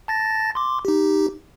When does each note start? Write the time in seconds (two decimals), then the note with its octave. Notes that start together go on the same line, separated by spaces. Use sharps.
0.08 A5 A6 A#6
0.55 C6 D6
0.85 D#4 G4